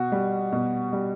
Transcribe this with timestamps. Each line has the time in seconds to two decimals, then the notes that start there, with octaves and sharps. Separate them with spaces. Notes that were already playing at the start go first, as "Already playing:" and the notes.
Already playing: B2 F#4
0.12 G3
0.52 B2
0.93 G3